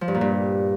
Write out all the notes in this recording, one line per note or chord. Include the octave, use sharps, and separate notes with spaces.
F3
G2
A#2
G2